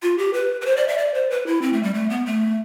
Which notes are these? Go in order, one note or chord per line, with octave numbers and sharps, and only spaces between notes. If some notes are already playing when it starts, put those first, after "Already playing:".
F4
G4
B4
B4
C5
D5
E5
D5
C5
B4
E4
C4
A3
G3
A3
B3
A3